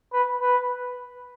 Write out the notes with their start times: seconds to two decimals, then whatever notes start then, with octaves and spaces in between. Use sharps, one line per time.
0.13 B4
0.41 B4